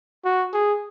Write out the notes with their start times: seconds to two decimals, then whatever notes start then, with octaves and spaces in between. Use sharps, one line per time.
0.25 F#4
0.53 G#4